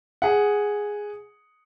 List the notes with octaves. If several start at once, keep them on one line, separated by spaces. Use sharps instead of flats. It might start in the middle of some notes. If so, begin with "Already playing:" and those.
G#4 F#5